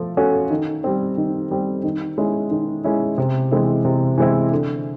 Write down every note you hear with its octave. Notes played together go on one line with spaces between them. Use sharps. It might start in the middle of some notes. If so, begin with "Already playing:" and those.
Already playing: F3 A3 A4
A3 C#4 F#4 A4
D#3
G3 C4
D#3
G3 C4
D#3
G#3 C#4 E4
D#3
G#3 C#4 E4
C3
E3 G#3 C4 E4
C3
E3 G#3 C4 E4
D3